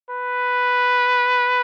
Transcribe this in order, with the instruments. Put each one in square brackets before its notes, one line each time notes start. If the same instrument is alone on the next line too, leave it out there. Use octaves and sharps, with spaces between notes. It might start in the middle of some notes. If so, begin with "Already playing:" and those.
[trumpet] B4